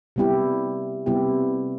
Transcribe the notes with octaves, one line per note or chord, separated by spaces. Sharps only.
C3 G3 B3 E4 G4
C3 G3 B3 E4 G4